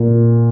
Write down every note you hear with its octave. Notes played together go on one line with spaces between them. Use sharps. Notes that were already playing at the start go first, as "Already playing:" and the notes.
Already playing: A#2